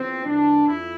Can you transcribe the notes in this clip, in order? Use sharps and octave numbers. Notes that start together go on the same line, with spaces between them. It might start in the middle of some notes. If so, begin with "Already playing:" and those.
Already playing: E2 F3 C4
C2 C3 E3 D4
F2 E4